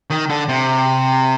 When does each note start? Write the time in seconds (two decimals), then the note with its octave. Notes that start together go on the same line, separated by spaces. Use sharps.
0.10 D#3
0.29 D3
0.48 C3